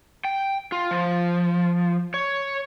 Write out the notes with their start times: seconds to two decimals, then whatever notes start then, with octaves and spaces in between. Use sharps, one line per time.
0.25 G5
0.72 F4
0.91 F3
2.14 C#5